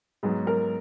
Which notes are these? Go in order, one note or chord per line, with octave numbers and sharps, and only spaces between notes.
G#2 F#3 B3 G#4
A#4